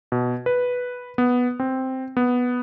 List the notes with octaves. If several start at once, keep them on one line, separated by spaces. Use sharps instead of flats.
B2
B4
B3
C4
B3